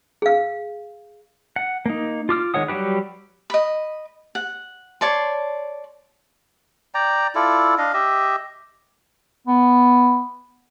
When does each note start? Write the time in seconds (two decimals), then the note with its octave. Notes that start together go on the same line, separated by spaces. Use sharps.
0.22 G#4 F5
1.56 F#5
1.86 A#3 D#4
2.29 F4 D6 F6
2.54 D#3 G#3 C#5 F#5 D#6
2.68 F#3 G3 F#4 G4 B4
3.50 D#5 B5
4.35 F#5
5.01 C#5 D5 A5 C6
6.94 D5 G5 A#5
7.35 E4 F4 A4 D5
7.78 D4 D#5 F5
7.94 G4 D#5 E5
9.47 B3